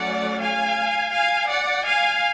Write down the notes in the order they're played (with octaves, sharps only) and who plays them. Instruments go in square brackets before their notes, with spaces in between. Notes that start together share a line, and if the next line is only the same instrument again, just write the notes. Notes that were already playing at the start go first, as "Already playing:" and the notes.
Already playing: [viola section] F#3 A3 C#4 D5 F#5
F5 G#5
F5 G#5
D5 F#5
F5 G#5